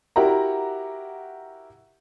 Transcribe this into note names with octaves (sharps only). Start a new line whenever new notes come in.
E4 F#4 G4 A#4 F#5 A#5